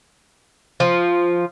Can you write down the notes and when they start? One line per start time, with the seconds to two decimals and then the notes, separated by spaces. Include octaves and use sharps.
0.80 F3